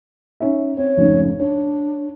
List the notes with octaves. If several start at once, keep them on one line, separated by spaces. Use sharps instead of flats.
C#4 D#4 E5
C4 C#5
F1 G#2 C#3
D4 C#5